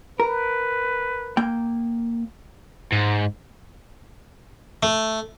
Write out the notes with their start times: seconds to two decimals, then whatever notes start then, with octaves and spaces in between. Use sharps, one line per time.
0.20 A#4 B4
1.37 A#3 G5
2.92 G#2
4.83 A3